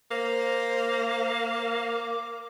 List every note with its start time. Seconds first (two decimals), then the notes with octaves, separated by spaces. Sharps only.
0.11 A#3 C5
1.88 D6